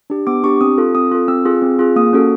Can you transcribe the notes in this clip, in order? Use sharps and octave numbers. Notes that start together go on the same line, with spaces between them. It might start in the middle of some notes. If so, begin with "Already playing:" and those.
D4 G4
B3 D6
D4 G4 C#6
C4 D#6
F4 A4
C4 D#6
F4 A4
C4 E6
F4 G#4
C4
F4 G#4
A#3 D#6
C#4 F#4 A4